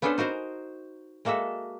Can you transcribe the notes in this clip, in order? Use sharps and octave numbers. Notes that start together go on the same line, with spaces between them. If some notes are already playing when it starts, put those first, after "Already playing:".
B3 C#4 D4 A4 B4 C5
D#4 F#4 A#4 C5
G#3 A#3 F#4 A4 E5